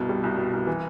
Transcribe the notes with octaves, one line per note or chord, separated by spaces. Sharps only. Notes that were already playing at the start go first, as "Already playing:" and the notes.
Already playing: C2 G2 B2
G3
C2
B2
C2
E3